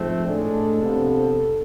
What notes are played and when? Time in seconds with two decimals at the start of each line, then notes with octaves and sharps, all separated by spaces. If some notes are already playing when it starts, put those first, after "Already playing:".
Already playing: G#2 F3 A3 C4
0.26 A2 G#3 D4 A4
0.81 C3 F3 B3 D4